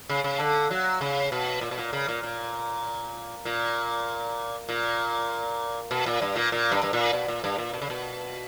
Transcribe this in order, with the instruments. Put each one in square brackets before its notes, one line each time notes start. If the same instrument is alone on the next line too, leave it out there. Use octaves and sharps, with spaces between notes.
[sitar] C#3
C#3
D3
F#3
C#3
B2
A#2
B2
A#2
C#3
A#2
A#2
A#2
A#2
B2
A#2
G2
A#2
A#2
G2
G2
A#2
B2
A#2
G2
A#2
B2
C#3
B2